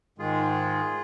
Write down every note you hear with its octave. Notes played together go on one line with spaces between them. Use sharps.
G#2 D#3 G#3 F4 G#4